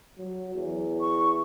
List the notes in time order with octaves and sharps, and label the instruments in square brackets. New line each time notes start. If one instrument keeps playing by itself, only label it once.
[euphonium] F#3
E2
[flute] C#6